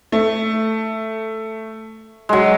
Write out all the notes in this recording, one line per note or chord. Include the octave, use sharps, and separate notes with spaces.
A3
F#3 G#3